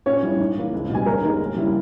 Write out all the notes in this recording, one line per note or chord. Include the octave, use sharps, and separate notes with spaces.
A#2 C#4 C#5
G3 C#4 E4
G#2
E3 A#3
C#2
B2 G3 G#5
E1 A#4 A#5
D#2 D#3 G#3
D#2
C#3 G3 C#4 E4